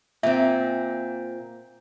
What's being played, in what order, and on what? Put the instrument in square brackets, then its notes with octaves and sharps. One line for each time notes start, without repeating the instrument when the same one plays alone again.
[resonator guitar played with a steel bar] A#2 C4 [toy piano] E5